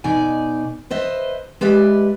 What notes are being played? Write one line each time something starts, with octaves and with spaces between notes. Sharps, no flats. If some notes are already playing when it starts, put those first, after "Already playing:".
B2 D#4 D5 G#5
B4 C5 D#5 E5
G#3 G4 B4 D5 E5